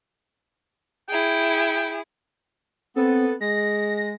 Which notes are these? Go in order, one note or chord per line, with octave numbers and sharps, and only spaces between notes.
E4 G#4 G5
B3 C4 A4
G#3 A#6